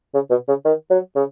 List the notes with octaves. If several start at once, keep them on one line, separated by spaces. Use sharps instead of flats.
C#3
B2
C#3
D#3
F#3
C#3